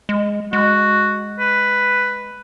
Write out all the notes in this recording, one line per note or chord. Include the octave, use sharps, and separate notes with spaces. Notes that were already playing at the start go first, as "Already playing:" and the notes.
G#3
G#3 F#4
B4